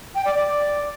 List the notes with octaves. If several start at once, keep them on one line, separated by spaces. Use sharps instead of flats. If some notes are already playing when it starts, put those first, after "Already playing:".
G5
D5
D5